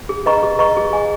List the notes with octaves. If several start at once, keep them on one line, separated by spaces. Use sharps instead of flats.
G#4
B4 D#5 A#5 C#6
G#4
B4 D#5 A#5 C#6
G#4
D#5 G#5